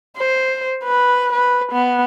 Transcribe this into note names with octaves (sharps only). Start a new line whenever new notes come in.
C5
B4
B4
B3